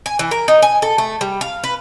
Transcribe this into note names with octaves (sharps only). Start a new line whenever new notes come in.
G#5
E3
A#4
D#4
G#5
A4
A3
G3
F5
B4